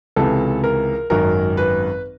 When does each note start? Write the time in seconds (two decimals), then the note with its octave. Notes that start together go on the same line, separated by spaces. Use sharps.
0.16 C#2 C3 E3 A4
0.64 A#4
1.10 G#1 F#2 D#3 A#4
1.57 B4